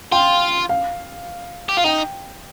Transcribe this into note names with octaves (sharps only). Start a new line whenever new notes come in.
F4 G5
F5
G4
F4
D#4 G5